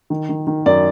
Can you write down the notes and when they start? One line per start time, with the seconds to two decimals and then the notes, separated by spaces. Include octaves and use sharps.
0.10 D#3
0.29 D#3
0.47 D#3
0.66 F#2 D5